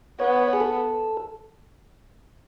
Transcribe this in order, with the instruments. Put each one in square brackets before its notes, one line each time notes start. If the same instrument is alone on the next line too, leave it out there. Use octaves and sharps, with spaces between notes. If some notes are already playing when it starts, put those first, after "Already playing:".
[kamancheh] B3 [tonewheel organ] C#5
[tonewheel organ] G#4
A4